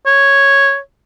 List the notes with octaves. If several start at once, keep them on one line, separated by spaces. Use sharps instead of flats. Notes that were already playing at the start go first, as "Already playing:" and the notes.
C#5